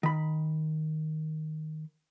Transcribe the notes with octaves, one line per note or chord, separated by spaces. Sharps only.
D#3 B5